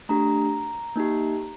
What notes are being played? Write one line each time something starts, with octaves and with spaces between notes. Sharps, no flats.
A3 D4 G4 A#5
A#3 D#4 G4